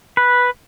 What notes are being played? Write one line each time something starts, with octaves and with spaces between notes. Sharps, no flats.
B4